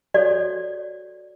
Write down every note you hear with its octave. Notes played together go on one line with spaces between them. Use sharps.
F#4 A4 C#5 D5